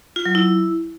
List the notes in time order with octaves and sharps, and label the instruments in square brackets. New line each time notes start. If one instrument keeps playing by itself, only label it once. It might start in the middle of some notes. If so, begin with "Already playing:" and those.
[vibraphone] F4
F#3
E4